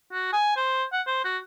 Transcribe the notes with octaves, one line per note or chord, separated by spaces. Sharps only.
F#4
G#5
C5
F#5
C5
F#4